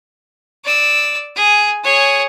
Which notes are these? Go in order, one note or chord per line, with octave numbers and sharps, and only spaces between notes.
D5 E6
G#4
G#4 C#5